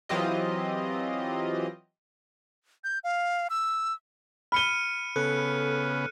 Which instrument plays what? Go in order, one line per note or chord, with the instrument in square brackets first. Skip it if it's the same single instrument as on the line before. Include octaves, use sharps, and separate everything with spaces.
[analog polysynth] E3 F#3 C4 F4 G4 D#5
[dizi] G6
F5
E6
[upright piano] B5 G7 [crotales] F6 C#7 D#7
[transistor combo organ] C#3 B3 [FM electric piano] A4 [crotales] F#6 C#7